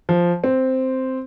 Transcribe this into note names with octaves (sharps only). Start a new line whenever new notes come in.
F3
C4